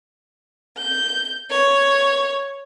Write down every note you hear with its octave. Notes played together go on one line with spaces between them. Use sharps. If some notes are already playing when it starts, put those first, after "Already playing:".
G6
C#5